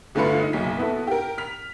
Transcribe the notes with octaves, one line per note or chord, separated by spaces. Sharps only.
G1 D3 A3 F4 B4 C#7
D#4 D#5
F#1 B1 F#3 B6
B3 E4 F#4 A4
G4 A#4
F6 B6 F7